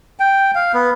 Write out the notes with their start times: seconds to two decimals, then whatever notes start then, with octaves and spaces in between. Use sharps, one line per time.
0.20 G5
0.55 F5
0.73 B3